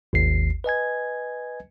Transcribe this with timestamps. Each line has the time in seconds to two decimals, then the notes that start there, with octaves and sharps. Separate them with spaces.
0.13 G#1 D#2 C7
0.64 B4 D#5 G#5 G#6